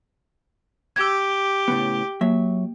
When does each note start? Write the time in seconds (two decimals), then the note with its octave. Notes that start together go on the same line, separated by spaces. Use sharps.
0.96 G4 E6 G#6
1.68 A2 C#3 B3
2.21 F#3 A#3 E5